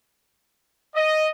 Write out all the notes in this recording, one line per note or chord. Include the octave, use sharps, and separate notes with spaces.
D#5